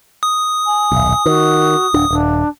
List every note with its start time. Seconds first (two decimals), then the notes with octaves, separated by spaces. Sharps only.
0.23 D#6
0.65 G#5
0.92 D#1 B1
1.26 D#3 F#4
1.94 D1 D4
2.10 D#1 D4